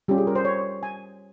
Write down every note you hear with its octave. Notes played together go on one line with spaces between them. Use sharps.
G3 C#4 F4 G4
G#4
A#4
C5
C#5
G#5